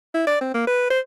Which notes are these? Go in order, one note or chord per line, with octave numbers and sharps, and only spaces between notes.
E4
D5
C4
A#3
B4
C5